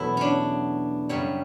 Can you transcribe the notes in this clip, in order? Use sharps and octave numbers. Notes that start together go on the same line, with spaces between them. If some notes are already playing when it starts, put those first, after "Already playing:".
Already playing: E2 B2 F#3 A3 E4 F#4
C#4 D4
F#2 C#3 G3 C#5